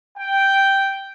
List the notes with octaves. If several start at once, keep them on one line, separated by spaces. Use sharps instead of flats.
G5